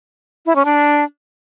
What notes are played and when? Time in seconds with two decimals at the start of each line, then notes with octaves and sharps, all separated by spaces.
0.46 E4
0.56 C#4
0.65 D4